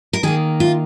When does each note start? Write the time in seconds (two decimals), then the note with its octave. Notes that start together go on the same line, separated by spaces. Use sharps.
0.13 A#4
0.23 D#3 A#3 G#4
0.60 F4